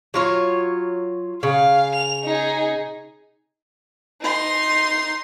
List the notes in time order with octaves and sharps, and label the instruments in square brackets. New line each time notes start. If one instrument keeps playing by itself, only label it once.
[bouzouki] F#3 F4 C#5
[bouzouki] C#3 [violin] F5
[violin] F7
D#4 G#4
[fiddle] D#4 C6